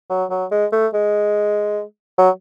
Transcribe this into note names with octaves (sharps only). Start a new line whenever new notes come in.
F#3
F#3
G#3
A3
G#3
F#3